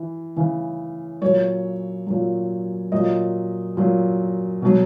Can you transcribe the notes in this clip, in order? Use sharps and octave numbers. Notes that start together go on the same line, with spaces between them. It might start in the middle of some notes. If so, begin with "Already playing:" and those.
Already playing: E3
C#3 E3
A#2 F#3 C#5
A#2 F#3
A#2 F#3 D#5
A#2 F#3
B2 F#3